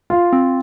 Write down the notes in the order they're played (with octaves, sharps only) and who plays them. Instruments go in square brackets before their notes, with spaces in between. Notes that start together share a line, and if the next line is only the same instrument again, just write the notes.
[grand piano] F4
[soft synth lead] C4